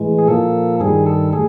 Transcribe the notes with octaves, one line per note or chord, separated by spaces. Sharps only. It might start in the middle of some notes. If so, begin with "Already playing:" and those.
Already playing: A2 E3 G#3
G#4
A#2 F3 A#3 A4
G2 D#3 G3 G#4
A4
A2 G#4